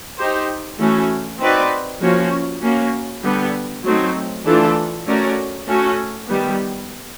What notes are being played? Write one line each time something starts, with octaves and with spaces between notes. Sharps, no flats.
D#4 G4 C5
E3 A3 C#4 F#4
C4 D#4 F#4 B4 D5
F3 A#3 C#4 F#4
A#3 C#4 F#4
D3 G3 B3
F#3 A3 C4 D#4
E3 A3 D4 F4 A4
A3 C#4 F#4 A#4 D5
A3 C#4 F#4
D#3 G3 B3